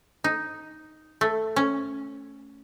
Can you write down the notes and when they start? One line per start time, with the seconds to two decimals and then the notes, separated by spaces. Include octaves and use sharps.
0.24 D#4
1.21 A3
1.56 C#4